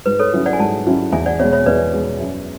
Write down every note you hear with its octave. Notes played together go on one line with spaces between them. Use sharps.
G#2 B4
A4 C#5
F#3 C#4 E4
D5 F#5
G#5
G#2 F#5 A5
F#3 C#4 E4
E2 E5 G#5
D5 F#5
B2 G#3 C#5 E5
C#5 E5
E2 B4 D5
B2 G#3
F#2